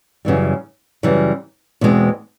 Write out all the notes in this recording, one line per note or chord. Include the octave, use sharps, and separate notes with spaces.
F#2 C#3 E3 G3
F#2 C#3 E3 G3
E2 B2 G#3 C4